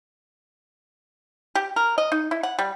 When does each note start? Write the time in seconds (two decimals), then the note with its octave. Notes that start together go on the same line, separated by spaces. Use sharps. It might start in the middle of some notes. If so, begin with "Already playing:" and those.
1.55 G4
1.76 A#4
1.98 D#5
2.12 D#4
2.31 E4
2.43 F#5
2.59 G3